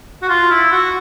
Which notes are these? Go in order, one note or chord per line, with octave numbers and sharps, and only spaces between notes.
F#4
F4
E4
F#4